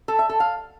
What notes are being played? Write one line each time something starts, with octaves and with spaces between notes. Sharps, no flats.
A4
E5
A4
F5